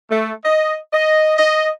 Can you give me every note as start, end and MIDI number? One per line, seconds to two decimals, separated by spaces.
0.10 0.31 57
0.43 0.75 75
0.92 1.35 75
1.37 1.68 75